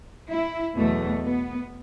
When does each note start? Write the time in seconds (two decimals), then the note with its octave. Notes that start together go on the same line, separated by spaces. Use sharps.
0.30 E4
0.76 E2 B2 F#3 A3
1.23 B3